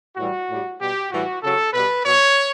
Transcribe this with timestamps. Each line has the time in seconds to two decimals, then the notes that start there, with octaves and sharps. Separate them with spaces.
0.16 A2 E3 G3 F#4
0.48 A2 G3
0.79 B2 G3 G4
1.10 A2 E3 G3 F#4
1.42 C#3 F#3 A4
1.73 B2 G3 B4
2.04 B2 F#3 C#5